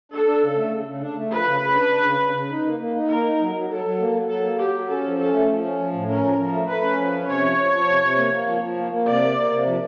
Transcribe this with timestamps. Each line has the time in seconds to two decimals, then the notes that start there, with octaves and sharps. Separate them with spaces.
0.12 D4 A4
0.26 D4
0.41 C#3
0.56 A3
0.71 C#3
0.86 C#3
1.01 D4
1.16 A3
1.30 F3 B4
1.46 C#3
1.61 C#3
1.75 D4
1.90 D4
2.05 C#3
2.21 C#3
2.35 C#3
2.50 D#4
2.65 A#3
2.80 A#3
2.95 D#4
3.10 A#3 A#4
3.25 D#4
3.39 F#3
3.55 F#3
3.69 F#3 A4
3.84 F#3
4.00 A#3
4.14 F#3
4.29 F#3 A4
4.44 A#3
4.58 F#3 G4
4.74 F#3
4.89 C#4 A4
5.04 F3
5.18 C#4 A4
5.34 A3
5.48 F3
5.64 C#4
5.78 F3
5.93 A2
6.08 C#4 A#4
6.24 F3
6.38 F3
6.52 A3
6.67 A3 B4
6.83 C#4
6.97 F3
7.13 C#4
7.27 C3 C#5
7.42 F3
7.57 F3
7.72 F3
7.87 C3
8.02 C3
8.17 A#3
8.32 A#3
8.46 F3
8.61 F3
8.77 A#3
8.92 A#3
9.06 C3 D5
9.22 A#3
9.36 A#3
9.51 C3
9.66 F3